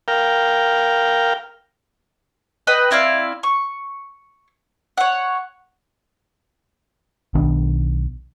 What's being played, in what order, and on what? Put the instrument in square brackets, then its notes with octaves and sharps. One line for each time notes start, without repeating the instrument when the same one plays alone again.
[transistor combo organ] A#4 F5 G5
[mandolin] B4 D#5 G5
C4 E4 D5 F5
C#6
C#5 F#5
[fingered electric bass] B1 D#3 B3 D4